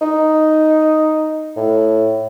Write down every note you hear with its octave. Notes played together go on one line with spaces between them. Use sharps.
D#4
A2